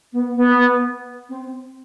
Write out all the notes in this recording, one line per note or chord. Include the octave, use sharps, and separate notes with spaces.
B3
B3
C4